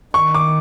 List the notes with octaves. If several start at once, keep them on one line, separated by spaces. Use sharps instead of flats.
D#3 C#6
D6